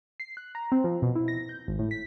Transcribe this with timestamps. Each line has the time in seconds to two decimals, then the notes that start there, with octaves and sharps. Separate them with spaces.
0.20 C7
0.37 F#6
0.55 A#5
0.72 C4
0.84 F3
1.02 B2
1.15 E4
1.28 A#6
1.49 G6
1.68 G#1
1.79 A2
1.91 B6